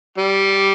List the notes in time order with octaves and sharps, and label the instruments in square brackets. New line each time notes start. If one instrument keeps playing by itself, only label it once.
[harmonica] G3